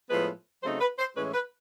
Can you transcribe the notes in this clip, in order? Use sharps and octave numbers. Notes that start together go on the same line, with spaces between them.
A2 F3 G#3 B3 B4
C#3 F#3 A3 C4 D#4 C5
B4
C5
A2 E3 G#3 C#4 B4
B4